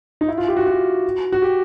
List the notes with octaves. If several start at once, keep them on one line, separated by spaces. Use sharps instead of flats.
D#4
E4
F4
G4
F#4
F#4
F#4
G4